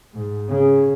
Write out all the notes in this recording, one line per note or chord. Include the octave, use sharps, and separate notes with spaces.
G#2
C#3